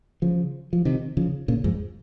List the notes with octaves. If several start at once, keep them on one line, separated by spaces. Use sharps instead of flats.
C#3 F3
F3
C3 D#3
C#3 F3
A#2 C#3
F2 G#2